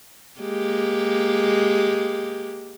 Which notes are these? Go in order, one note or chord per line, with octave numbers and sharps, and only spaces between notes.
G#3 A#3 G4